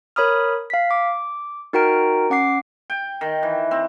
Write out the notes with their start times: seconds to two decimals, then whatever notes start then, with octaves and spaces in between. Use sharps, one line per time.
0.16 A#4 C#5 B5 D#6 F6
0.70 F5 B6
0.91 D6
1.73 D#4 F#4 A#4 G5 A#5 D7
2.30 C#4 F#5 D6 C7
2.90 G5
3.21 D#3
3.43 E3
3.71 C4